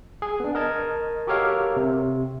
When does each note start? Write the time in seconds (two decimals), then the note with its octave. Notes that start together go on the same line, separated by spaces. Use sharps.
0.22 G#4
0.40 B3 D4
0.55 A#4 D#5 A5 G#6
1.27 F#4 G4 A4 A#4 C#5 F5
1.77 C3